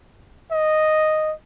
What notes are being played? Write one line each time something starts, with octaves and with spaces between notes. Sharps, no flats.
D#5